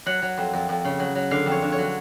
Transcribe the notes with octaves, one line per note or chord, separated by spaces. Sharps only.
F#3 F#5
F#3
F2
F2
F2
C#3
F#3
F#3
D3 F5
F2
C#5
D3
C#5
F#3